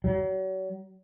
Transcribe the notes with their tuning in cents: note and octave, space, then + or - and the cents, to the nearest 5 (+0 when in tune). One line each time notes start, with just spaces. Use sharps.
F#3 +40